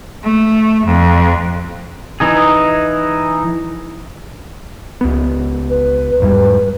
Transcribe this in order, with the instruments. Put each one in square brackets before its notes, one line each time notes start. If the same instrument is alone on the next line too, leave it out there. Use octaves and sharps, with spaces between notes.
[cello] A3
F2
[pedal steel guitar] E3 D#4 G#4
[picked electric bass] C#2 B3
[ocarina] B4
[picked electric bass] E2 G#2 G3 [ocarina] B4